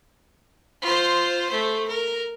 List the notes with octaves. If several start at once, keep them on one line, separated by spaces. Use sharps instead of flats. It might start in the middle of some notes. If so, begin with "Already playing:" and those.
F4 C5
A3 C5
A#4